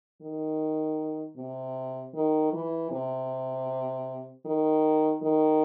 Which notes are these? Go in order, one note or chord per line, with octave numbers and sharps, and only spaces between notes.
D#3
C3
D#3
E3
C3
D#3
D#3